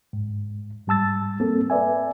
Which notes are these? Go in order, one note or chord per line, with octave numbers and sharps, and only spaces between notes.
G#2
G#2 G3 A5 E6 A6
A#3 C4 A4
B4 D5 E5 G#5